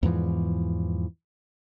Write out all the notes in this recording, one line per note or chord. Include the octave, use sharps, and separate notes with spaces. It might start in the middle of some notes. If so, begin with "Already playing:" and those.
E2 G#2 E3 F3